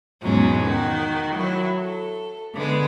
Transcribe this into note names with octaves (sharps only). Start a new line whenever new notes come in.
E2 G#2 B2 F#3 G#3 C#4
D#3 F#4
F#3 E4
A4
D3 G#3 B3